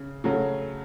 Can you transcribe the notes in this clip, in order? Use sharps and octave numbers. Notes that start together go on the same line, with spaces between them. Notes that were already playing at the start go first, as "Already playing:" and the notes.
Already playing: C#3
C#3 F#3 A3